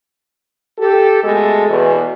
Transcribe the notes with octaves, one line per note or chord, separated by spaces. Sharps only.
G4 A4
B2 G#3 A3 A4
E2 B2